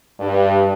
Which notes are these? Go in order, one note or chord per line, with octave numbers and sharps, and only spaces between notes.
G2